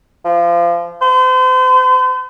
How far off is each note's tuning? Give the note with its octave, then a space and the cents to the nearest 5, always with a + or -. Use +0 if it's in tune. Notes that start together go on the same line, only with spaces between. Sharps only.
F3 -25
C5 -40